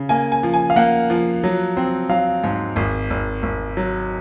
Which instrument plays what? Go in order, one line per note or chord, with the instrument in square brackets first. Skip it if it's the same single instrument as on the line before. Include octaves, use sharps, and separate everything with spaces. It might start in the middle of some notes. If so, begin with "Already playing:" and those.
Already playing: [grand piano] C#3
A#3 G#5
G#5
F3
G#5
F5
A#3 F#5
F3
F#3
C4
F#3 F5
G#2
G#1
G#1
G#1
F#3